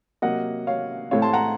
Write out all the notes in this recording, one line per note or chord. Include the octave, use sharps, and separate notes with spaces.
C3 F#3 A#3 D#5 F#5
C#5 F5
A2 A3 C4 C#5 F5
A5 C6
F#5 A#5